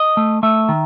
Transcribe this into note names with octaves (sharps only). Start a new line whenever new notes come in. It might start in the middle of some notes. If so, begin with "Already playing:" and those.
Already playing: D#5
A3
A3 E5
D#3